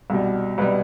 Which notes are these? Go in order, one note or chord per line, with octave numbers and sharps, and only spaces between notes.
C2 B2 G3
C2 B2 G3 B4